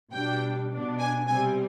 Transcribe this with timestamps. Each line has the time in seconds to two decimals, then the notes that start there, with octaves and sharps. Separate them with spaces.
0.12 B2 G3 D4 G5
0.71 B2 B3 D4
0.99 G#5
1.28 C3 G3 C4 G#5